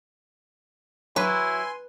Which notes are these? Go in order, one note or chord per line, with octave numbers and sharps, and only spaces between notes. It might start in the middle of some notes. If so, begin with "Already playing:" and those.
F#3 E4 B4 G#5 C6